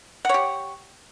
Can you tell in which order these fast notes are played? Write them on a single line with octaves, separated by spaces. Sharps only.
F#5 C#5 G4